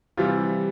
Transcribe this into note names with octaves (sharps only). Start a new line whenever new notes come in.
C3 E3 G3 F4